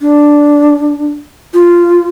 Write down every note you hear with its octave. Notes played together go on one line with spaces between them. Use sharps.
D4
F4